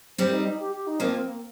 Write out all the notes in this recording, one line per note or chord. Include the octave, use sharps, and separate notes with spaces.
G3 C4 C5
D#4
D#4
G4
G4
D#4
F3 A#3 C4
C4
A#3